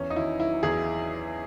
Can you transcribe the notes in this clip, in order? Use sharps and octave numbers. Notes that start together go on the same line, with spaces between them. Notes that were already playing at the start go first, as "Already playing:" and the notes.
Already playing: E2 C#4
D#4
D#3 E4
F#3 E4
E2 G#4